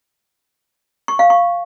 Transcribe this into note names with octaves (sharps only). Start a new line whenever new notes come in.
C#6
F5
C#6